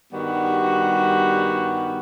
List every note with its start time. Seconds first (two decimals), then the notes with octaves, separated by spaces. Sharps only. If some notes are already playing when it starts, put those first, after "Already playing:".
0.12 G2 D#3 G3 B3 F#4